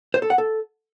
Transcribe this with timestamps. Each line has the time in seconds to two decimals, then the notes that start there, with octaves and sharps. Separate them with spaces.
0.14 C5
0.22 A4
0.30 F#5
0.38 A4